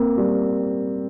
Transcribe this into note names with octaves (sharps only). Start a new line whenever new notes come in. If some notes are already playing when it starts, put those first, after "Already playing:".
Already playing: A#3 C4
G3